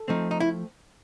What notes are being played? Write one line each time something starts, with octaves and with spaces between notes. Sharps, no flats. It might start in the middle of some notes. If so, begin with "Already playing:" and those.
Already playing: A4
F3 A3 C4 D#4
D#4
E4